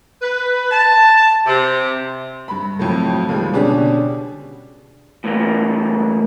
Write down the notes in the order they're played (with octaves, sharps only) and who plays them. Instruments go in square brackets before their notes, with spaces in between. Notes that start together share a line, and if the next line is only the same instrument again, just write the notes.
[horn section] B4
A5
C3
[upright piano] G2 B5
F2 A2 F#3
D#2 F3 G3 G#3
B2 D3 C#4 D4 G4 G#4
[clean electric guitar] A2 E3 A#3